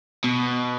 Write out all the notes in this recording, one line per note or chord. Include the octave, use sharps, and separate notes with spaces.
B2